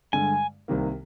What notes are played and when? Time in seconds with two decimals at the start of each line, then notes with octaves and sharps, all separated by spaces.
0.13 G2 D3 G#3 G#5
0.68 C2 C3 D#3 A#3